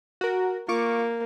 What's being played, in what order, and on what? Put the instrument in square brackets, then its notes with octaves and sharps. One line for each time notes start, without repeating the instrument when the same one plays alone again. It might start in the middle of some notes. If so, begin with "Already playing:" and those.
[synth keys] F#4 A#4
[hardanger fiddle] A#3 [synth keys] F4 C#6 D6